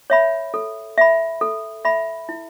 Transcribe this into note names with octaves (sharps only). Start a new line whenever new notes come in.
C#5 E5 B5
A4
E5 B5
A4
E5 B5
E4